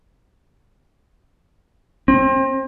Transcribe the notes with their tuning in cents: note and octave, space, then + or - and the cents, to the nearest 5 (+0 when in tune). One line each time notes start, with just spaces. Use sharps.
C4 +30